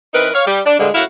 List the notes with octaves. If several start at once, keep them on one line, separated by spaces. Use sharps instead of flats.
E3 C4 D#4 A#4 B4
C#5 F5
G3
D4
G2 A#2 D3 F3 G#3
F#2 A2 E4 F#4 F5 F#5